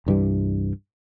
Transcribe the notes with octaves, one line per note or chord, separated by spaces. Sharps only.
C2 G2 E3 G3